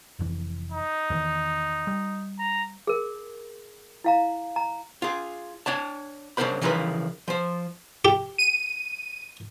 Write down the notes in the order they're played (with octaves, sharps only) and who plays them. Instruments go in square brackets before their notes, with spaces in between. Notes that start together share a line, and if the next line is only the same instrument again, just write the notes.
[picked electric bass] F1 F2 E3
[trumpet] D#4
[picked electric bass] E2 D#3
G3
[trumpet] A#5
[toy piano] G#4 A#4
E4 F5 A#5
A#5
[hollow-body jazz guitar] F4 G#4
D4 C#5 D5 A5
C#3 D4 E4 A#4 C5 B5
C#3 E3 F3 D#4 A#4 B4
F3 C5
[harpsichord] G4
[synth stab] D#7